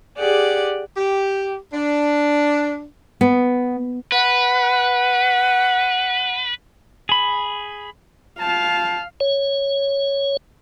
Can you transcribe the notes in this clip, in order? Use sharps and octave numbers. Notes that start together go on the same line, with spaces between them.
G4 G#4 D5 F#5
G4
D4
B3
B4 F#5
G#4 B5
F4 F5 G5 A5
C#5